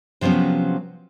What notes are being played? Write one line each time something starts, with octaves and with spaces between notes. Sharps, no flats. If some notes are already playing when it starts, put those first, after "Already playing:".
C3 F3 F#3 B3 C#4